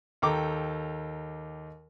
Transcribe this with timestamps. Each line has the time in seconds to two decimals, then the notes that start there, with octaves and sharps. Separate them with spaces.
0.22 D#2 A4 G5 A#5 D6